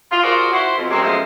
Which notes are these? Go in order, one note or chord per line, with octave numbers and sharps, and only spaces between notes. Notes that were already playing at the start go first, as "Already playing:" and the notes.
F4
F4 F#4 G#4 A#4 C5 D5
E4 F#4 C5
F2 B2
F#2 F#3 G#3 A#3 C4
F#2 B2 F3 G#3 A3 C5